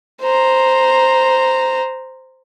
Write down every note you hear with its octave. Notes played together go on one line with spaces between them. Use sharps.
C5 A#5